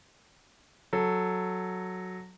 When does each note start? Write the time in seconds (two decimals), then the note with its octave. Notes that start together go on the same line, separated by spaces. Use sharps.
0.93 F#3 A4